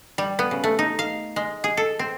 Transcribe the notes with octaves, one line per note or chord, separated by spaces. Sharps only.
G3
B3
C#3
A3
D#4
F5
G#3
G#4
A4
C4